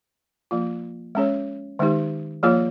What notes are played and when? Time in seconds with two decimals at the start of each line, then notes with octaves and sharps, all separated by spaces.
0.51 F3 A#3 F4
1.15 G#3 C#4 G#4 C#5
1.79 D#3 G#3 D#4 G4
2.43 F3 A#3 F4 G#4 C#5